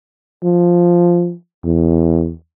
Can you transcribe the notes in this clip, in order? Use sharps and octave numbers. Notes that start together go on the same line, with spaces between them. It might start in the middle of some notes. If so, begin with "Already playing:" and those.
F3
E2